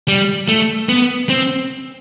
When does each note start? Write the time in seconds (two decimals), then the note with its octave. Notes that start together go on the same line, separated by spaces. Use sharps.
0.08 G3
0.48 A3
0.89 B3
1.29 C4